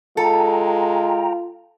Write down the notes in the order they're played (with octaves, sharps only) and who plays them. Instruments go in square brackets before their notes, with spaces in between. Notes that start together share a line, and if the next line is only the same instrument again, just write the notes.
[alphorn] G#3 [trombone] F4 [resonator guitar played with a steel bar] A4 [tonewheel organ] G5 A#5